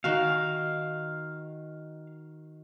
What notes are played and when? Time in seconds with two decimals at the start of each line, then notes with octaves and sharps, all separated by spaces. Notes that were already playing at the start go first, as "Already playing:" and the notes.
0.04 D#3 F#4 F5